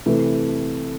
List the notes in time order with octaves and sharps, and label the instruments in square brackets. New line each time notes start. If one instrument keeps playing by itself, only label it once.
[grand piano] C3 E3 A3